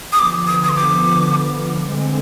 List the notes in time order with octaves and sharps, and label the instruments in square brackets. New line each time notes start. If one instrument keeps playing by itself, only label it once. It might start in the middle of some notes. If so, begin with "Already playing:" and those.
[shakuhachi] D#6
[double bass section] D3 F3 B3 [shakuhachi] D6
[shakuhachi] D#6
D#6
C6
D6
[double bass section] D3 G#3 C4